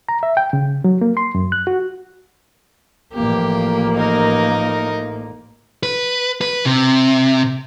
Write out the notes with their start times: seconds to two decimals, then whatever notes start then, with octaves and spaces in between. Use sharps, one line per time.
0.09 A#5
0.23 E5
0.37 G5
0.53 C#3
0.84 F#3
1.01 A#3
1.17 C6
1.35 F#2
1.52 F#6
1.67 F#4
3.14 A1 F3 A#3 G4
3.96 D#4 A#4
5.83 B4
6.41 B4
6.66 C3